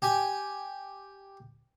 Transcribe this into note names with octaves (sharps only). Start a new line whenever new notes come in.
G4 G#5